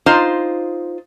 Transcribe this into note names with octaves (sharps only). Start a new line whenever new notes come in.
D#4 F4 C5